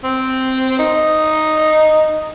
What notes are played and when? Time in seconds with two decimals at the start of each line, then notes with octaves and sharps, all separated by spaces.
0.04 C4
0.79 D#4